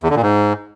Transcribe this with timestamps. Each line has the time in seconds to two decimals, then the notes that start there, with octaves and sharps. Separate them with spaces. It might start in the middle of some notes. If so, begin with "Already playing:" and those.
0.03 E2
0.10 D3
0.16 A#2
0.23 G#2